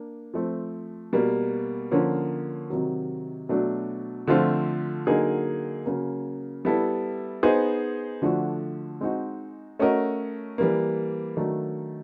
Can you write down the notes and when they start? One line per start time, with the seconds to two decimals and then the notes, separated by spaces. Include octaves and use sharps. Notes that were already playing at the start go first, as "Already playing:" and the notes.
Already playing: A#3 D4
0.34 F3 A3 C4
1.13 B2 G3 A#3
1.91 D3 F3 A#3 C#4
2.70 C3 D#3 F#3
3.49 B2 F#3 A3 D4
4.28 D3 F3 A3 C4 F4
5.07 D3 F#3 A#3 D#4 G#4
5.86 C#3 F#3 A#3
6.65 G3 B3 E4 A4
7.43 B3 D#4 G#4 C5
8.22 D3 F3 A3 D4 F#4
9.01 G#3 C4 D#4 F#4
9.79 A3 C#4 F#4 A#4 D#5
10.58 E3 G3 A#3
11.37 D#3 F#3 A3 D4